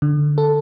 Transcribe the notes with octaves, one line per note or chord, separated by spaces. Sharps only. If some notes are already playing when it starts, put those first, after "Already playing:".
D3
A4